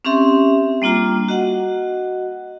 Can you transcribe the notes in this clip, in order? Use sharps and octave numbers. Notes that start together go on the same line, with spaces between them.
C4 C#4 G4 E5 C6
G3 A#3 D4 F4 A#5
F#4 D#5 F#5